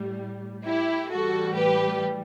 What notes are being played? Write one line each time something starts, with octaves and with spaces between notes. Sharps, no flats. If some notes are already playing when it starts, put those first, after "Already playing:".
Already playing: A2 G3
E4 G4
A2 E3 G3 F#4 A4
G4 B4